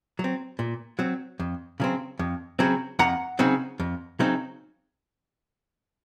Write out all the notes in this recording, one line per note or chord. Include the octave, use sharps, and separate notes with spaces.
F#3
C4
A#2
F#3 C4
F2
C#3 F#3 C4
F2
C#3 F#3 C4
F2 F#5 A#5
C#3 F#3 C4 D#4
F2
C#3 F#3 C4 D#4